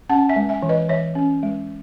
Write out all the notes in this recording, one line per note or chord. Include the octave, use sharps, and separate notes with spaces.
C#4 F#5 A5
E5 G#5
G#3
E5 G#5
E3
B4 D#5
E3 C#5 E5
C#4
G#3